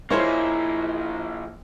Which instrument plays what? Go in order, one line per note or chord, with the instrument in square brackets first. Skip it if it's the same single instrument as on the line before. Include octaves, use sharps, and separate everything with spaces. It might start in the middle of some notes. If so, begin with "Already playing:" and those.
[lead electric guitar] F3 A#3 [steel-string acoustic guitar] D#4 E4 G#4 [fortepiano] C5 C#5 C#6